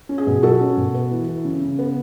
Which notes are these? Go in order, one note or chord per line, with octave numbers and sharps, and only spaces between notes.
C#4
G#4
B2
F#3 F#4 A4
C#4
B2
B3
E3
E3
C#3
C#3
B3